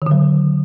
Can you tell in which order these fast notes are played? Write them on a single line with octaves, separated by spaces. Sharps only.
D#3 D3 F#3